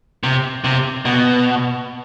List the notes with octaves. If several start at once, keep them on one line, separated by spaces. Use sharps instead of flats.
C3
C3
B2